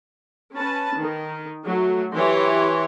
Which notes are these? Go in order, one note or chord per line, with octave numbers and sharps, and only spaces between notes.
C#4 B4 A5
D#3
F#3 A3
E3 G4 C#5 C6